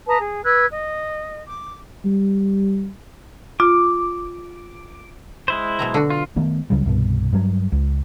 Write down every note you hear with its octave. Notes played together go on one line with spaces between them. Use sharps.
B4 A5 A#5 D#6
G#4
B4 E6 F#6 G#6
D#5
D6
G3
F4 D6
G#3 E4 C5
B2 F#3 A#5
D3 F#4
F4
D#3 A3 B3
C#2 C#3 F#3 G3
C2 G2 B2
G2 F#3
C#2